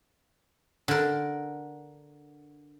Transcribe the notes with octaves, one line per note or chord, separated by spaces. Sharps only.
D3 A#4